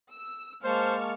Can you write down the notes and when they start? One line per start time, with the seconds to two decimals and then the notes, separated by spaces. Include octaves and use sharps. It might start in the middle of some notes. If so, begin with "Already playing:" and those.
0.11 E6
0.64 G#3 A#3 C5 A5 C#6 F6